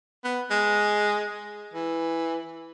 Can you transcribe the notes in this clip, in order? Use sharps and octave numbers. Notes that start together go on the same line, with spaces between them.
B3
G#3
E3